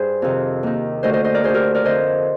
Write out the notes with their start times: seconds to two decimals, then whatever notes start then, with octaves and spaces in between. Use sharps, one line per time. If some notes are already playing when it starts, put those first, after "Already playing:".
Already playing: G2 G#4 C5
0.22 F2 C3 D#3
0.63 D#2 D#3
1.03 D2 D3 C5 D#5
1.13 C5 D#5
1.24 C5 D#5
1.34 A#4 D5
1.44 D2 D3 G#4 C5
1.54 G4 A#4
1.75 A#4 D5
1.85 F2 D3 C5 D#5